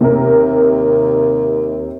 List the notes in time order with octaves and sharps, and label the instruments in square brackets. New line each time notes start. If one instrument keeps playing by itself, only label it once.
[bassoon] D#2 [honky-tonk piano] C3 A#4